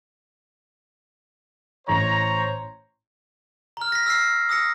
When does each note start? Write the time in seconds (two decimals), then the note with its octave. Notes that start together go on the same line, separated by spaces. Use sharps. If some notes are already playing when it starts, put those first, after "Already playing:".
1.88 A1 A2 C5 C#5 A#5 C#6
3.77 A#5 F6
3.92 A#6 B6
4.06 E6 F6 A#6 C7
4.49 D#6 E6 A#6 C#7